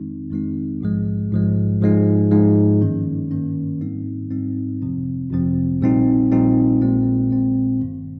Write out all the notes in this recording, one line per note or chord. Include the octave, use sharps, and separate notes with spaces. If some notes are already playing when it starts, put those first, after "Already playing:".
Already playing: F2 D#3 G#3 C4 D#4
F2 D#3 G#3 C4 D#4
A#1 G#2 F3 G#3
A#1 G#2 F3 G#3
G#2 F3 G#3 D#4
G#2 F3 G#3 D#4
G2 D#3 A#3 C#4
G2 D#3 A#3 C#4
G#2 G3 C4 D#4
G#2 G3 C4 D#4
G1 F2 C3 F3 C4
G1 F2 C3 F3 C4
A#1 A#2 G3 C4 D#4
A#1 A#2 G3 C4 D#4
A#1 A#2 G#3 C4
A#1 A#2 G#3 C4
G1 G2 D#3